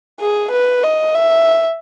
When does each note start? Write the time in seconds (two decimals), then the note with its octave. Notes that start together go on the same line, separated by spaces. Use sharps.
0.20 G#4
0.51 B4
0.84 D#5
1.15 E5